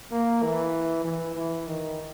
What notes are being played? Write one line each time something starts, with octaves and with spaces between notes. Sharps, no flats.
A#3
E3
E3
E3
D#3